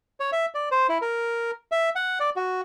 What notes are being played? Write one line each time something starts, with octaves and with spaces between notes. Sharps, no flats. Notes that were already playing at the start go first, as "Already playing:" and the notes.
C#5
E5
D5
C5
E4
A#4
E5
F#5
D5
F#4